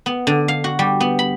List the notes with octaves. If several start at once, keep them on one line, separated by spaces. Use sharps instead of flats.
B3
D3
F5
F#4
G3
B3
B5